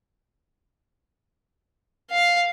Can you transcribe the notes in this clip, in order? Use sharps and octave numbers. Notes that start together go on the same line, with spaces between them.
F5